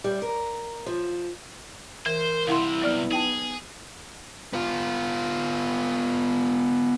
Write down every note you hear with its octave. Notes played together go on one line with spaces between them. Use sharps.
G3
A#4
F3
E3 A#4 C5
C2 C3 E4 F5 F#5 C6
F#3 B3 D5 F6
D#4 G#4 G5 A5
B3 F4